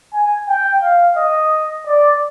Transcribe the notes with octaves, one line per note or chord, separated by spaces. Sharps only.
G#5
G5
F5
D#5
D5